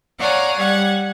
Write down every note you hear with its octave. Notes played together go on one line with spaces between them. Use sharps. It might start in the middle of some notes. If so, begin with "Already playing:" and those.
C#5 D5 F5 F#5 G#5 A#5
G3 F#5 G#6